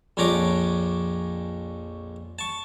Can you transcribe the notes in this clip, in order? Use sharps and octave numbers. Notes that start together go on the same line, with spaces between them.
A#1 F2 C#4 D4 A#5 D6
A5 C#6